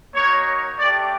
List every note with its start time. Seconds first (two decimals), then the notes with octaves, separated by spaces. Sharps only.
0.14 A#3 D#4 F#4 C#5
0.79 A3 D4 G4 D5